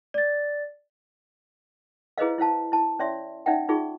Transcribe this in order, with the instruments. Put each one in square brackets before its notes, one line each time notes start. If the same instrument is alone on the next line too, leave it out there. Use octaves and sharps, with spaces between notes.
[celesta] D5 A6
[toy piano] E4 G#4 B4 C5 D#5 F5
E4 C5 F5 A5
E4 A5
C#4 C#5 D5 E5 C6
C#4 D#4 D5 E5 F#5 G5
D#4 F4 G#4 C#6